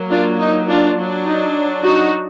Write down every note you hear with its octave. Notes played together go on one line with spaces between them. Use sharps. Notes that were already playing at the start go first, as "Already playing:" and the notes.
Already playing: F#3 A#3
D4 F4
D#4
D4 F4
F#3 D4
D#4
D#4 F#4